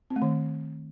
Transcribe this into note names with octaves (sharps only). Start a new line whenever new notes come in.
C4
A3
D#3